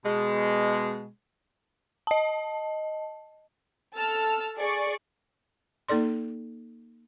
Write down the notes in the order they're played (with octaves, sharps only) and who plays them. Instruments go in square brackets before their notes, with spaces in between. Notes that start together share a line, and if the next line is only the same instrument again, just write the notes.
[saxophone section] B2 G#3
[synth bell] D#5 A5
[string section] A4 A5 E6 F6
G#4 D5 C#6
[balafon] A#3 D#4 A4 D5 C6